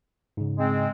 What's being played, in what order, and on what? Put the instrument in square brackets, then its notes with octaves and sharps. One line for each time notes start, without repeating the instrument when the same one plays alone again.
[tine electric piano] G#2 C#3
[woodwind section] G#3 C4